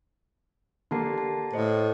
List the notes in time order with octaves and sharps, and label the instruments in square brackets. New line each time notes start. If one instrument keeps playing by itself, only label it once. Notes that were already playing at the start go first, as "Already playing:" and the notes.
[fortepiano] D3 A#3 [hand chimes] G4 A5 C7
[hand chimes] A5
[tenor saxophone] A2 [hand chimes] C5 D#5